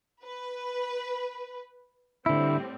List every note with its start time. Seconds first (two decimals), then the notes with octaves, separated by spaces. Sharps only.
0.24 B4
2.26 A2 D3 G3 C4 E4